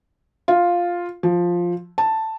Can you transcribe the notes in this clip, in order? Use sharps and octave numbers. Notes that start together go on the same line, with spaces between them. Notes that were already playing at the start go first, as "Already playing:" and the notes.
F4
F3
A5